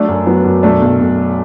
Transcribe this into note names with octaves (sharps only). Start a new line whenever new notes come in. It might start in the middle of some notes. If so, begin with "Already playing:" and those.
Already playing: F#3 A3 D4
F#2
F#3 B3
F#2
B1 A3 D4
B1
B1